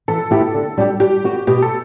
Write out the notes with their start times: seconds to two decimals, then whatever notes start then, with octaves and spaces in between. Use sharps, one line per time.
0.08 E3 A4
0.31 B3 E4 G4
0.54 D3
0.78 G3 D4 G4
1.00 G3 G4
1.24 B3 F#4
1.47 B2 G4
1.62 A4